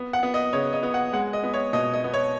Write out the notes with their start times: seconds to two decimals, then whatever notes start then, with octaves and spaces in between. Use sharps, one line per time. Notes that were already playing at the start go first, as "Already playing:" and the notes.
Already playing: B3
0.13 F#5
0.23 B3
0.34 D#5
0.53 C#3 C#5
0.73 D#5
0.83 B3
0.94 F#5
1.13 G#3 F#5
1.33 D#5
1.43 B3
1.54 C#5
1.73 B2 D#5
1.94 D#5
2.04 B3
2.14 C#5